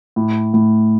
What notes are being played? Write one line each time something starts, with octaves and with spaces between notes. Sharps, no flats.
A2
A2